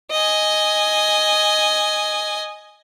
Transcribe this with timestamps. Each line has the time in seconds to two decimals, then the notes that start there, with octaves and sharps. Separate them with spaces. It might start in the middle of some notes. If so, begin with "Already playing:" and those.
0.11 D#5 G#5